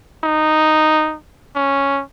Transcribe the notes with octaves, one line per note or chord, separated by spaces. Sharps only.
D#4
C#4